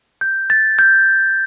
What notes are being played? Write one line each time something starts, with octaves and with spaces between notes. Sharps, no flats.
G6
A6
G6